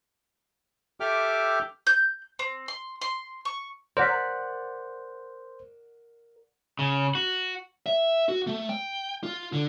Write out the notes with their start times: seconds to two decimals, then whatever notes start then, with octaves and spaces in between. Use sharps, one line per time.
1.00 G4 A4 E5 G5 D6 F6
1.87 G6
2.39 C4
2.68 C6
3.01 C6
3.45 C#6
3.97 A#4 C5 D5 F#5 B6
6.79 C#3
7.15 F#4
7.86 E5
8.29 F#4
8.47 A3
8.69 G5
9.23 F4
9.53 D3